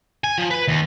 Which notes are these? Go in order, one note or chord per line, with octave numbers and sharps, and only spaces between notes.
G#5
F3
B4
D#2